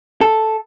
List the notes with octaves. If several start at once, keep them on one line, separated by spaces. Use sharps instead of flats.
A4